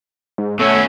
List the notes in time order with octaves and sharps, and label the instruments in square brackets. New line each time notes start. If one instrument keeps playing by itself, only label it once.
[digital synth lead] G#2
[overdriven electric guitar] B2 C#4 [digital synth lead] A3 [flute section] C#5 F#5 E6